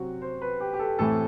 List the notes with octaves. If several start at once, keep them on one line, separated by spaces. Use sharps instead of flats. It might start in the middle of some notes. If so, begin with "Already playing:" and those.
Already playing: C3 F#3 C4 F#4
C5
B4
G4
G4
A4
A2 E3 A3 C4 A4